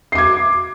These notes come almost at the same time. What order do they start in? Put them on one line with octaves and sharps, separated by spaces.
C7 D6 G#6